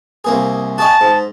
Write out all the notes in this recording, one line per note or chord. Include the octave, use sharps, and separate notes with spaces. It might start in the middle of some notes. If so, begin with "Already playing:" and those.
C2 A#3 G#4
F#4 G#4 D#5 A5
G#2